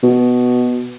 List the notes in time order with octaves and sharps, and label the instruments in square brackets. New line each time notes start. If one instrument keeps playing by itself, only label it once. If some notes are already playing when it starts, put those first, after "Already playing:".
[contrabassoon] B2